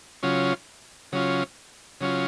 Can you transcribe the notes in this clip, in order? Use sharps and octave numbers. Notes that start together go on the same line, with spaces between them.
C#3 F#3 C#4 F4
C#3 F#3 C#4 F4
C#3 F#3 C#4 F4